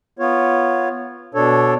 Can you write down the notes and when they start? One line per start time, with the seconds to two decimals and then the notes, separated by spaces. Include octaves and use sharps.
0.19 B3 F4 C#5
1.34 B2 D4 A4 C#5